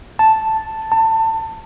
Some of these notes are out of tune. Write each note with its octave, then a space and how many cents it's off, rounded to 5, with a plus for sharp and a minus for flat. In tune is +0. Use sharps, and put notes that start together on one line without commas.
A5 +0
A5 +25